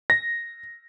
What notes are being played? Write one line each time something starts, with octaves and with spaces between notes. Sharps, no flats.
A#6